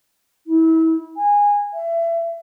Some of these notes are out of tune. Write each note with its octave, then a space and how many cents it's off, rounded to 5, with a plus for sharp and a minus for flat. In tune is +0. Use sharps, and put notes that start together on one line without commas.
E4 -30
G#5 -15
E5 +30